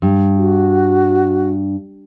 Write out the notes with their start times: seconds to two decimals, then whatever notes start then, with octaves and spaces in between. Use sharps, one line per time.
0.02 G2
0.38 F#4